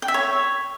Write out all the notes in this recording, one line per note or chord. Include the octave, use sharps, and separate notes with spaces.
G5
E5
C#5